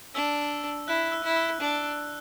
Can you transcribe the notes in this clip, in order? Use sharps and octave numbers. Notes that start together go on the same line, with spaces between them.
D4 E6
E4 F#6
E6
E4
E6
D4